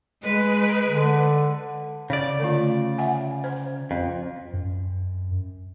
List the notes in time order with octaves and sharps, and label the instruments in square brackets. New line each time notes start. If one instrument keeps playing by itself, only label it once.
[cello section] G#3 B4
[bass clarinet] D3
[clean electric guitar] C#3 D5
[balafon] D3 A3 F4
E5 F#5 G#5
C5
[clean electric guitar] F2
[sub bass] F#2